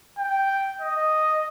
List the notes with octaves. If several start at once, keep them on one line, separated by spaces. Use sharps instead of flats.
G5
D#5